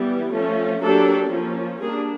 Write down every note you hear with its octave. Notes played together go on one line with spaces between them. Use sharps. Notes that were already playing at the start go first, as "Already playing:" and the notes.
Already playing: E3 G3 B3
F3 A3 C#4
F#3 A#3 D4 G4 A4
F3 A#3 C#4
G3 A#3 D4 G#4 A#4